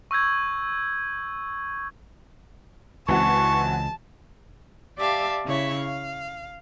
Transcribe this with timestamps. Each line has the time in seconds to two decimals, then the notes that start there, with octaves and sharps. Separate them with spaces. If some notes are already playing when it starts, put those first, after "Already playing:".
0.11 C#6 E6 G6 G#6
3.08 C#2 E3 C4 F#4 A5 C#6
4.99 G4 D5 E5 F5 A5
5.46 C#3 E4 C#5 E5
5.80 F5